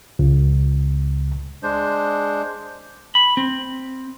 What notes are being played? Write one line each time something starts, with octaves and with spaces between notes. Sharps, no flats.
C#2
G#3 D4 C5
B5
C4